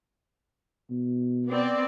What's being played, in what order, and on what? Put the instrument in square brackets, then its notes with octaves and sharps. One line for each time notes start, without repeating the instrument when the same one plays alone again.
[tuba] B2
[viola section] B3 C4 D5